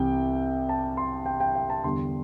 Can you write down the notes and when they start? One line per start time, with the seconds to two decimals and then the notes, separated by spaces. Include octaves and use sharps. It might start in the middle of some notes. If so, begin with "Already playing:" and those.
Already playing: C2 C3 E3 G5
0.69 A5
0.97 C6
1.26 G5
1.40 G5
1.55 G5
1.70 A5
1.84 E2 D3 G3 C6